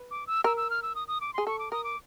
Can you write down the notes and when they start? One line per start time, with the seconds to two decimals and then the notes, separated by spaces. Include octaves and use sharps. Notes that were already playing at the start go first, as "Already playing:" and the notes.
Already playing: B4
0.11 D6
0.27 E6
0.44 A#4 E6
0.57 E6
0.70 F6
0.83 E6
0.95 D#6
1.08 D#6
1.21 D6
1.34 G#4 C6
1.47 A4 C#6
1.59 D6
1.72 A#4 D#6
1.84 D6